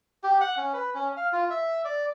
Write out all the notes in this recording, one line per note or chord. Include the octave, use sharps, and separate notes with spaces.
G4
F#5
C#4
B4
C#4
F5
F4
E5
D5